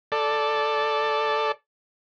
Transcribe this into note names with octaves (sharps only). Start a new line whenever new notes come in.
A4 D5